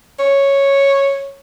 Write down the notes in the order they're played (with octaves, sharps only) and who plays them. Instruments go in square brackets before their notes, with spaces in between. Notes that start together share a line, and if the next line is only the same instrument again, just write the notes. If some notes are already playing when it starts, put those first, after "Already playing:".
[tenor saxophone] C#5